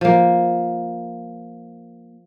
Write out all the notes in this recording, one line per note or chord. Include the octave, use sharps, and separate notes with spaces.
F3 A#3